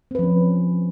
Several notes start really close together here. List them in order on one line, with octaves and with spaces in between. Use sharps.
C4 B4 F3 C#4